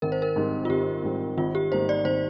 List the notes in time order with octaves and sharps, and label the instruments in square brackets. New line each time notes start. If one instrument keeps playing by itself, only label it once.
[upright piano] G#1 [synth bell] A#4
[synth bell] C5
A#4
[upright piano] G#2 G3 C4
[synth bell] F4
[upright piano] G#1 [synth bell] G4
[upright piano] G#2 G3 C4
[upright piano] G#1 [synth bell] F4
[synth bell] G4
[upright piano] G#2 G3 A#3 D#4 [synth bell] C5
[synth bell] D5
[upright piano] G#1 [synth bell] C5